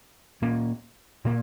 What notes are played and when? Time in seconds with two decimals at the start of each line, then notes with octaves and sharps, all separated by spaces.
0.42 A#2 A#3 C#4
1.25 A#2 A#3